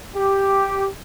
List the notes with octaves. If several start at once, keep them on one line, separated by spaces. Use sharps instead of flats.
G4